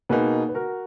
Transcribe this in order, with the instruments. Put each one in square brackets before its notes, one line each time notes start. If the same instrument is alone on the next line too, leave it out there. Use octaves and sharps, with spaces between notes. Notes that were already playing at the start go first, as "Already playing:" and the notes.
[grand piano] B2 A#3 D#4 [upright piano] G#4 B4
[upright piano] B4
F#4 A#4